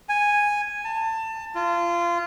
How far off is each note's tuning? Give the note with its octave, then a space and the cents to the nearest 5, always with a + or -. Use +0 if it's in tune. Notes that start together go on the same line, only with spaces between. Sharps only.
G#5 -5
A5 +25
F4 -25